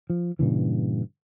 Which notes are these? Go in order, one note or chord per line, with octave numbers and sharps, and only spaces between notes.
F3
G2 A#2 C#3 E3